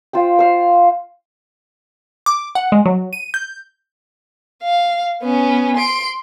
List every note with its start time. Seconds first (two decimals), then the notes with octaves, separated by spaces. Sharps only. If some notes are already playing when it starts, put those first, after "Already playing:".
0.13 F4 C5 G5
0.39 C5 F5
2.26 D6
2.55 F#5
2.72 G#3
2.86 F#3
3.13 D#7
3.34 G6
4.63 F5
5.22 B3 C#4
5.77 C6 D7